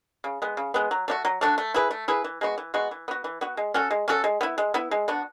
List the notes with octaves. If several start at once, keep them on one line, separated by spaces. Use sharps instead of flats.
C#3
G#3 B3
C#3
G#3 B3
F#3
A3 D4 F#4
F#3
A3 D4 F#4
A3
E4 G#4 B4
A3
E4 G#4 B4
E3
G#3 B3 F#4
E3
G#3 B3 F#4
E3
B3 F#4
E3
B3 F#4
G#3
C#4 F#4 A4
G#3
C#4 F#4 A4
G#3
B3 E4
G#3
B3 E4
G#3
B3 D4 F#4